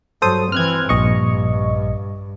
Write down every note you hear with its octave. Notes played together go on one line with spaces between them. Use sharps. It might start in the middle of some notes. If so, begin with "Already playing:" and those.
G2 F#3 A4 C5 D#6
E3 C4 F6 F#6 G#6
A#1 G2 D#5 C#6